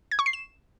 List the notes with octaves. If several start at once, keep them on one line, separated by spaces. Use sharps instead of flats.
G#6
C#6
C7
E7